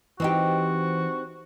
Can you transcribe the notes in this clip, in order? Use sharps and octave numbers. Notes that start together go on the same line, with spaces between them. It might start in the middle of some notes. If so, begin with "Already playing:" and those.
E3 C4 D#4 F#4 G4